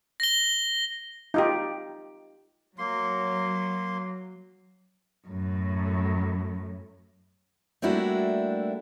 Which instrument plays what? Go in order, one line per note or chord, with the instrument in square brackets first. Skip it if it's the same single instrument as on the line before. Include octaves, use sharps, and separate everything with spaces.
[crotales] A#6 G7
[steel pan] D#4 F4 G4
[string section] F#3 [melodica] A#3 C6
[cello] F#2 A2
[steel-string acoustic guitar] G3 A3 A#3 D4 E4 F#4